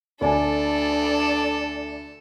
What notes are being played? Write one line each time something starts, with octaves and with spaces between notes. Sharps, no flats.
D2 D4 A4 D5 G#5